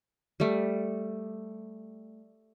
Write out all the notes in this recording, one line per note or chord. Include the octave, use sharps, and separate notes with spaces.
G3 A3